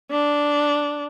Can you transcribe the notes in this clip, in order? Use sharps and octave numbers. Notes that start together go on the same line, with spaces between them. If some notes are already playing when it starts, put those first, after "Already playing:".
D4